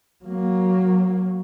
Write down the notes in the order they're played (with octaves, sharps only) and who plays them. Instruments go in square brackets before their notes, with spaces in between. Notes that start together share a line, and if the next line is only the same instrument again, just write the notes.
[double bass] F#3 A#3